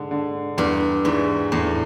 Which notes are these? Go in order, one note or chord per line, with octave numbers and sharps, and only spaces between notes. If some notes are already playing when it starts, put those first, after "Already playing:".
Already playing: G#2 D3
D3
E2 G2
G#2 E3
E2 A2